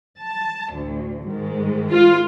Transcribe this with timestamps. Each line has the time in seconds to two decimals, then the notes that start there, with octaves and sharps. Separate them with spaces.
0.20 A5
0.71 A1 D2
1.29 G#2 D#3 G#3
1.91 F4